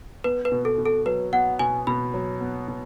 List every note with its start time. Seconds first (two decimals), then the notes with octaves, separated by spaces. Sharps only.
0.24 B3 B4
0.45 B4
0.52 B2
0.65 A4
0.78 B2
0.85 A4
1.06 F#3 B4
1.33 B3 F#5
1.59 B2 G#5
1.87 B2 B5
2.14 F#3
2.41 B3
2.68 B2